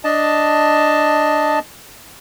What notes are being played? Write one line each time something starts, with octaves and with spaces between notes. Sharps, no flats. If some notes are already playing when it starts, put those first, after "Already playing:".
D4 D#5 A5